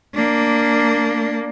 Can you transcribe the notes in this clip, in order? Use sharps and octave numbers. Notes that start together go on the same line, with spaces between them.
A#3 D4